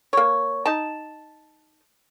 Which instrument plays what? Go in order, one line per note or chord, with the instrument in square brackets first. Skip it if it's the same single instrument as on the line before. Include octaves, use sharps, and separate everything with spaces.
[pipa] A#3 C#5
D#4 A5